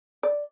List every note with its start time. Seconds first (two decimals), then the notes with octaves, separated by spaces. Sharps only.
0.23 D5